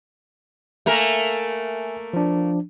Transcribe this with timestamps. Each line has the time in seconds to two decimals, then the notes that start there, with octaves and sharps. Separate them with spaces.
0.86 A3 A#3 A#4 E5 G#5
2.13 F3 D4